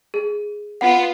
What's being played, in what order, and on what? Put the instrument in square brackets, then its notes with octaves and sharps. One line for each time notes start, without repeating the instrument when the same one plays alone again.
[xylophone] G#4
[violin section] B3 F4 [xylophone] F#5